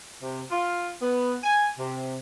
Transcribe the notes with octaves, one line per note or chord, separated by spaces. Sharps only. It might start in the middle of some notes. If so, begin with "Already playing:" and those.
C3
F4
B3
G#5
C3